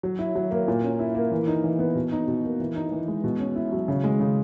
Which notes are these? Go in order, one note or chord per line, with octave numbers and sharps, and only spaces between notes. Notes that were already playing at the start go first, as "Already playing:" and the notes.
F#3
E4
F#3
A#3
A#2
C#4
E4
A#3
E3
D#4
E3
B3
B2
D#4
B2
A#3
E3
D#4
E3
G#3
B2
C#4
E4
F#3
C#3
G#3
C#3